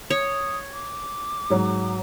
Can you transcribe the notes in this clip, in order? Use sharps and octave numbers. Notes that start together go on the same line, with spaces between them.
C#5 D#6
D6
G#2 F#3